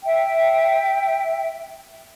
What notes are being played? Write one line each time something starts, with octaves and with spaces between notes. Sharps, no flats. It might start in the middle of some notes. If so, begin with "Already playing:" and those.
E5 G5